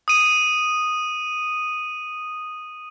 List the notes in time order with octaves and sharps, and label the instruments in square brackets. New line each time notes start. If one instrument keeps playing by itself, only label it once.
[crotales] D#6 D#7